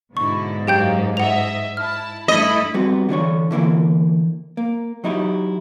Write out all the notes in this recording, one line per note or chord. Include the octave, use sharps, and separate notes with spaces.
G#2 B2 D3 E4 C#6
F#2 F#3 A#3 G4 G5 G6
D#5 E5 F#5 F7
E4 A5 F6
G2 A3 E4 D#5 B5
G3 B3 C4 F#4
D3 E3 D4 C#5
D3 E3 A#3 E4
A#3
F#3 D#4 E4 F#4 G4